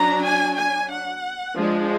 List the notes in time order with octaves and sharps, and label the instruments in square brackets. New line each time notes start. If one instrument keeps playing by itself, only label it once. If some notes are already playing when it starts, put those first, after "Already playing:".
Already playing: [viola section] F#3 D4 A#5
G#5
G#5
F#5
F3 G#3 D4